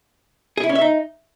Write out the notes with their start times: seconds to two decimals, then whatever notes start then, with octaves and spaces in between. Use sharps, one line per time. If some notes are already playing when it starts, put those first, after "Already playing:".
0.57 G#4
0.63 E4
0.69 C#4
0.75 E5
0.81 D#4